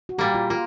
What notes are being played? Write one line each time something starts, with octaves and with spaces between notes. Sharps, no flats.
F#4
A#2 G3 A#3 G4
F4
A#3 F4